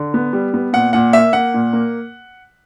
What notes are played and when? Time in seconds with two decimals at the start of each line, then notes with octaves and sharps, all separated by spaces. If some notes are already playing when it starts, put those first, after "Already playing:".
Already playing: D3
0.14 B3
0.33 G3
0.54 B3
0.73 A#2 F#5
0.93 A#2 F#5
1.13 A#3 E5
1.33 A#3 F#5
1.54 A#2
1.73 A#3